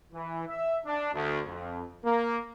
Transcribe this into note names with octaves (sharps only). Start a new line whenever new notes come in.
E3
E5
D4
D2
F2
A#3